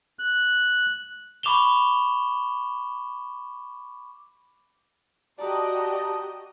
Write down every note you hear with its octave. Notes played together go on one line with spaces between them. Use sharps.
F#6
B5 C#6 D6 E7 F7 G7
F#4 G4 D5 D#5 A5 A#5 D#6